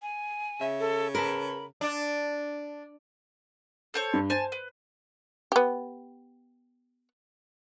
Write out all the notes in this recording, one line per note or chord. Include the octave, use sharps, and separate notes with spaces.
G#5
C#3 E5
A4
G#4 A#4 B4 A5 B5
D4
A4 C5 C#5
G2
C5 G#5 A5
B4
B3 G4